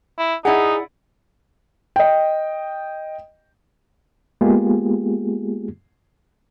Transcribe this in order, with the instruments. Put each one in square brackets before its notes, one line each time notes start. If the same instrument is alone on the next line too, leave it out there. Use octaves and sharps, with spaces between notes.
[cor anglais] E4
[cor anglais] D#4 [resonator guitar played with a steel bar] E4 D5 F#5 [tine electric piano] G#4
[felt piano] D#5 G5
[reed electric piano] G#3 A#3 B3 F4 G4 G#4